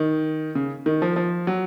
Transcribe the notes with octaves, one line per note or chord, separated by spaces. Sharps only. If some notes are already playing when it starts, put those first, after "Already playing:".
Already playing: D#3
C#3
D#3
F3
F3
F#3